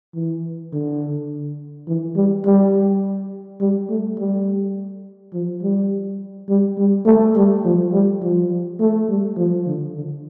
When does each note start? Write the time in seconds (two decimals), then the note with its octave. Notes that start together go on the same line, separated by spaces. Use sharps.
0.14 E3
0.73 D3
1.88 E3
2.16 G3
2.45 G3
3.61 G3
3.90 A3
4.19 G3
5.34 F3
5.62 G3
6.49 G3
6.78 G3
7.06 A3
7.35 G3
7.65 F3
7.93 G3
8.22 F3
8.80 A3
9.09 G3
9.37 F3
9.67 D3
9.95 D3